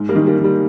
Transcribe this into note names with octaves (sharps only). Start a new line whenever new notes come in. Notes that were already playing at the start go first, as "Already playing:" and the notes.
Already playing: G#2
G3 A#3
D#3
G3 A#3
D#3
G3